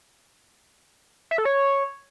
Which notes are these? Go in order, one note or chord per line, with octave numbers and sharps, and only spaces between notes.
E5
A4
C#5